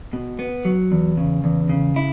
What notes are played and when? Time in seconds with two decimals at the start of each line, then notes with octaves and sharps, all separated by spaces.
0.13 B2
0.39 B3
0.65 F#3
0.92 E2
1.17 C#3
1.44 E2
1.69 C#3
1.96 E4